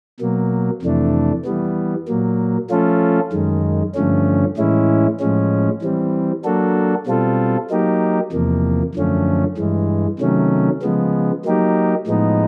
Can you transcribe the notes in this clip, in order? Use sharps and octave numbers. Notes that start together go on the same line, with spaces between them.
B2 F#3 A#3
F2 C3 E3 A3 D4
E3 G3 B3
A#2 F#3 A#3
F3 A3 C#4 F4 A4
F#2 D#3 G#3
G2 D3 F3 A3 C#4
A2 E3 G#3 C#4 E4
A2 F3 G#3 C#4
E3 G3 C4
F#3 A#3 D4 F#4 A4
B2 G3 C4 F4 A4
F#3 A#3 D#4 G4
E2 C3 F3 A#3
F#2 D3 F3 A3 C#4
G2 E3 G#3
C3 D#3 F#3 A3 C#4
C#3 F3 G#3 B3
F#3 A#3 D#4 G4
A2 F3 G#3 B3 D#4